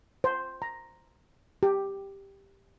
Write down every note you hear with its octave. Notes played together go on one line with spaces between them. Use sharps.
C5
A#5
G4